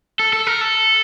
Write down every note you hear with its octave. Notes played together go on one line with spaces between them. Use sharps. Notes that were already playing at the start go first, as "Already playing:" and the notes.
A4
A4
A#4
A4